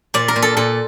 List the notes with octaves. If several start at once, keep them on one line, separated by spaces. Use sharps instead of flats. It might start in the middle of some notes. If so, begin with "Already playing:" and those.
A#2 D5
A#4
A#2
A4
A#2 A4